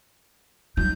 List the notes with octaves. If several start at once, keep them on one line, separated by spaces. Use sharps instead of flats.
F#3 D#4 G6